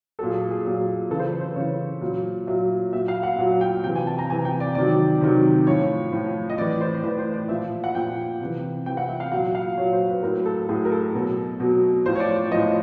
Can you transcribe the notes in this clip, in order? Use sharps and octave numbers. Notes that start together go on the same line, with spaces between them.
A#2 F#3 A4
G#4
G#4
A#2 F#3
C#3 E3 A4
C5
B4
C5
C#3 E3 C#5
A#2 F#3
A#2 F#3 E5
A#2 F#3 E5
F5
F#5
A#2 F#3 F#5
F#5
G5
C3 E3 G5
G#5
A5
A#5
C3 E3 G#5
G5
D5
C3 D#3 F#3 D5
C3 D#3 F#3
A2 F3 C#5
A2 F3
D#5
A2 E3 D5
C5
A2 E3 B4
C5
D5
A#2 F3 E5
F#5
A#2 F3 G5
C3 E3
C3 E3 G5
F#5
E5
F5
A#2 F#3 F#5
F5
A#2 F#3 C#5
C5
B4
A2 F#3 A#4
A4
A2 F#3 G#4
A#4
A4
B2 F#3
B2 F#3
A2 F3 C5
C#5
D5
D5
A2 F3 D#5